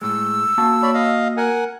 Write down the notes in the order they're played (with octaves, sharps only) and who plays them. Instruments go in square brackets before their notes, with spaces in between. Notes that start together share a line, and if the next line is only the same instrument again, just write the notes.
[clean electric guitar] A2 G#3 [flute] E6
[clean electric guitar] A#3 F#4 A5
[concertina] C#5 D5 B5
D#5 F5
A#4 F#5 G#5